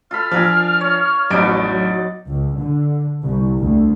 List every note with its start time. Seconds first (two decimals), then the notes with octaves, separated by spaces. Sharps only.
0.11 F4 A4 B5 F6
0.31 F3 D4 A#4 G#5
0.81 C#5
1.30 A1 F2 F#3 B3 D#4 D5 D7
2.29 C#2
2.60 D3
3.22 C2
3.59 D2